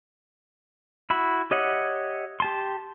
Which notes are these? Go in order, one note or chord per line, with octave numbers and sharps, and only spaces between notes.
E4 F#4 B5
G4 C#5 D#5 E5 F#5
G4 A5 C6